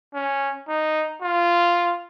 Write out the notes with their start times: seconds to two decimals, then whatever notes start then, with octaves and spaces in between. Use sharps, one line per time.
0.14 C#4
0.67 D#4
1.21 F4